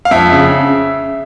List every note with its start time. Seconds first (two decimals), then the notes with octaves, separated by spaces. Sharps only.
0.05 F5
0.11 F2 E5
0.32 C#3